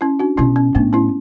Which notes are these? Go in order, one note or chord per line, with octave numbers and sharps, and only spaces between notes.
C#4 E4
D4 F#4
B2 C#4 E4
C#4
A2 B3 D4
C#4 E4